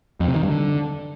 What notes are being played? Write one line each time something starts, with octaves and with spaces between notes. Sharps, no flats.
F2
C3
D#3
G2
D3